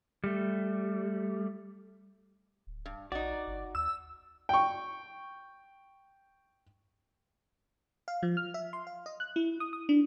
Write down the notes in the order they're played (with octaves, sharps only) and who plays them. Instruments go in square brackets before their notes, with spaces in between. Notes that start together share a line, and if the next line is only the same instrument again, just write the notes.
[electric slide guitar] G3 A3
[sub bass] D1
[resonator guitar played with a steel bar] G2
[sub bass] A#1 [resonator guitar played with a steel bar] D#4 F#4 [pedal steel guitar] D5
[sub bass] G1
[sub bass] D#2 [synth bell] E6
[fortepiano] G5 C#6
[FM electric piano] F5
F3
F6
E5
C6
F5
D#5
F#6
E4
D#6
D#6
D4